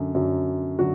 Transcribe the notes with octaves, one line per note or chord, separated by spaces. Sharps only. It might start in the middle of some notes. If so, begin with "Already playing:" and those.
Already playing: F#2 D3 F#3
F#2 D3 F#3
D3 F#3 F#4